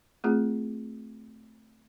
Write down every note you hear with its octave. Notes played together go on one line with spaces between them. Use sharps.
A3 C4 F4 G#4